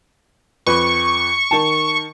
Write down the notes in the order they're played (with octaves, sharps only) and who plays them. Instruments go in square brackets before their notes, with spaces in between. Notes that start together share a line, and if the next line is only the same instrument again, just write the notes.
[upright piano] F2 B4 [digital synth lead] C#6
[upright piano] D#3 A5